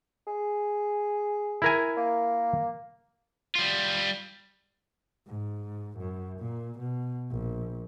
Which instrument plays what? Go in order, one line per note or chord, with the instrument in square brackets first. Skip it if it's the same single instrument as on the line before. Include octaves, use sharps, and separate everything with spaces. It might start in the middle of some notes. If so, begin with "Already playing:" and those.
[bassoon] G#4
[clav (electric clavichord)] E4 A#4 G#5
[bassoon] A#3
[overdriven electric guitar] G3 F4
[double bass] G#2
F#2
A#2
B2
A#1